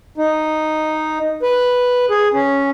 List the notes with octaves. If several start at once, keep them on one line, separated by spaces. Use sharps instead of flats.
D#4
B4
G#4
C#4